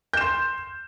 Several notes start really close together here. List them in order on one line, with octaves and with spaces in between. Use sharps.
G6 E7 C6